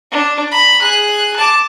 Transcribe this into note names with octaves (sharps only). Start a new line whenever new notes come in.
D4
A#5 B5
G#4 F#6
A5 D6